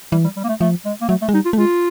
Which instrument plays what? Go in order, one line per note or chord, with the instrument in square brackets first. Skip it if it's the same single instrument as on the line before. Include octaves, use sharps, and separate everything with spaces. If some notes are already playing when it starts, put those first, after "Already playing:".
[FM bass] E3 [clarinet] G3
[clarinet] G3
G3
A#3
A3
[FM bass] F3 [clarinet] A3
[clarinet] G#3
A#3
[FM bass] F#3 [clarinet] A3
[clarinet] A3
[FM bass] G#3
[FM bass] G3 [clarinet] D#4
[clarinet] F4
[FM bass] A3
[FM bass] G#3 [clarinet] F4